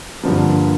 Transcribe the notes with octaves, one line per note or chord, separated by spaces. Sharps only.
G2 D3 F3 A#3